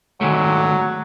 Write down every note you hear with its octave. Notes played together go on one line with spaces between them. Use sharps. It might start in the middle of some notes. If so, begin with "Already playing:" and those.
D#3 F#3 G#3 A3